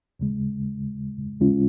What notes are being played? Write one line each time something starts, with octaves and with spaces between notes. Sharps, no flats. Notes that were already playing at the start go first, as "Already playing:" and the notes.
D#2 C#3 G#3
D#2 C#3 G#3 C#4 F4